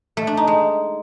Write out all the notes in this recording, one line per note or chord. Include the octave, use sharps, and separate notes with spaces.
A3
D4
D#4
G#3